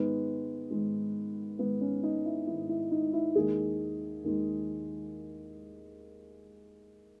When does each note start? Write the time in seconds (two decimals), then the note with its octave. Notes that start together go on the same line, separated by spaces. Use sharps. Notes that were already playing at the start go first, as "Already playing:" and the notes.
Already playing: G#2 D#3 G#3 B3
0.70 G#2 D#3 G#3
1.59 G#2 D#3 G#3 B3
1.81 C#4
2.03 D#4
2.25 E4
2.47 G#2 D#3 G#3 E4
2.69 E4
2.91 D#4
3.13 E4
3.35 D#2 D#3 G#3 G#4
4.24 D#2 D#3 G#3